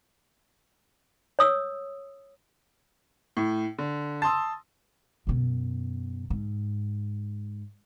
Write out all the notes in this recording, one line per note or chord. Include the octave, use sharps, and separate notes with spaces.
C#5 D#6 E6
A2
D3
A5 C6 D#6 E6
F#2 B2
G#2